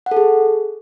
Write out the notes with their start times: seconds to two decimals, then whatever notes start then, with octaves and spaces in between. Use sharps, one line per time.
0.06 F#5
0.11 A4
0.17 G#4